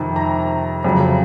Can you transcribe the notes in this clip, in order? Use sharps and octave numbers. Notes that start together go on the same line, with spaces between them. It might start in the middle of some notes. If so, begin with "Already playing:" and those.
Already playing: F2 C3 D#3
A#5
F2 C#3 F#3